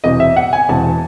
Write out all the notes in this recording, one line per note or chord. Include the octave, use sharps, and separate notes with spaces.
E1 E2 C3 D#5
E5
F#5
G#5
E1 E2 C3 A5